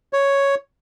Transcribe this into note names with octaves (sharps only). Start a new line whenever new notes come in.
C#5